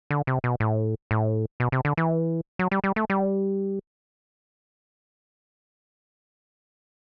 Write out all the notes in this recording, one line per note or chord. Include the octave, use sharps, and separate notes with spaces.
D3
C3
B2
A2
A2
B2
C3
D3
E3
F#3
G3
G3
A3
G3